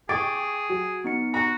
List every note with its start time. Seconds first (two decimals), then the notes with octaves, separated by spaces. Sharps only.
0.09 G#4 G5 C#6 D6 A6 D7
0.69 F#3
1.04 B3 D#4 C#7
1.34 F#4 A#5